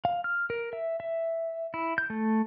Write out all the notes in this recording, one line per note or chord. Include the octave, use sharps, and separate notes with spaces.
F5
F6
A#4
E5
E5
E4
G6
A3